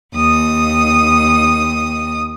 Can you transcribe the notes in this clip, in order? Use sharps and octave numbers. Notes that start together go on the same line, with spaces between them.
D#2 D#6